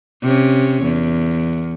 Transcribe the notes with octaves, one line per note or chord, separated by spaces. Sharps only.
C3 C#4
E2